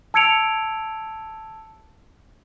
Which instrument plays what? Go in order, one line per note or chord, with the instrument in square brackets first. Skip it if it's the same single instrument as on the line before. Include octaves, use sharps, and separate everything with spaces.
[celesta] A5 E6 G#6 C#7 D7 F7